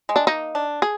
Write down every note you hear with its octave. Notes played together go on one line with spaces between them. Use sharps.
G#3
D4
A#3 D#4
D4
G#4